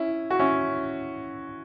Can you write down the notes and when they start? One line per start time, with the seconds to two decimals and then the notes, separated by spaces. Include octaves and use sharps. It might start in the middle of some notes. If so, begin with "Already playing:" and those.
Already playing: C#4 E4
0.30 F#4
0.39 C#4 E4